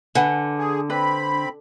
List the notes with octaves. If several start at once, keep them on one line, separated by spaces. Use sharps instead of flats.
D3 B4 F#5 G#5
G#4
C4 D4 B4 B5